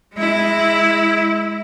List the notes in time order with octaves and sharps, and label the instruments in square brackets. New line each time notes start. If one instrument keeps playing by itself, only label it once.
[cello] G#3 E4